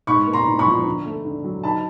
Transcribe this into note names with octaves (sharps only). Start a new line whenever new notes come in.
G#2 B5 C#6
A#3
A#5 C6
G#2
B5 C#6
F3
D3
A3
D3
F#3
D#4 A5 B5